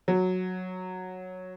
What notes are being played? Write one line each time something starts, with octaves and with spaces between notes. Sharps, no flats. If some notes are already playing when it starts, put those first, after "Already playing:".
F#3